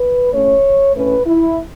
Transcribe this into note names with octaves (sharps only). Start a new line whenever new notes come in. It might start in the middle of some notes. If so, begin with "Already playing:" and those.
Already playing: B4
A2 A3 C#4 C#5
A2 A3 C#4 B4
E4